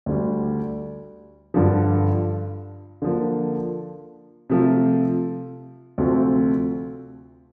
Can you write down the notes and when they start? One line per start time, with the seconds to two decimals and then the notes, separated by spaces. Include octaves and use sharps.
0.06 D2 D3 G3
1.54 G2 D3 F3
3.02 D3 F3 A#3
4.50 C3 F3 A3
5.98 D2 C3 F3 A3 C4